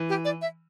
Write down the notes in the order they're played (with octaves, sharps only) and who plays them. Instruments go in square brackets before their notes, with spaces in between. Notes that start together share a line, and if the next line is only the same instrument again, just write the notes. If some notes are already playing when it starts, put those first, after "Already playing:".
Already playing: [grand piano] E3
[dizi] G4
D5
E5